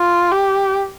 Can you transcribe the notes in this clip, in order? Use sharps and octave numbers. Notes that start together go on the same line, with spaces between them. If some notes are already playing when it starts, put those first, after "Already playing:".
Already playing: F4
G4